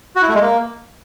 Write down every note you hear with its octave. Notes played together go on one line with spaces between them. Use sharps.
F#4
E4
A3
G#3
A#3